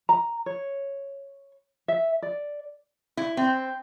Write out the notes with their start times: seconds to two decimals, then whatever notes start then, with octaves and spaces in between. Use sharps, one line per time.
0.09 A#5
0.46 C#5
1.88 E5
2.22 D5
3.17 E4
3.37 C4